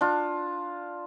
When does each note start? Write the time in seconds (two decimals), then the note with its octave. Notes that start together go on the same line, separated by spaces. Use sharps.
0.01 D4 F4